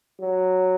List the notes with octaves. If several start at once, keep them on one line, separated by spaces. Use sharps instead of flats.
F#3